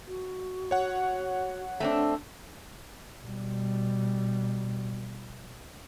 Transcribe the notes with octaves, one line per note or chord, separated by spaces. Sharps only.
F#4
C#5 F#5
A3 C4 D4
B2 G3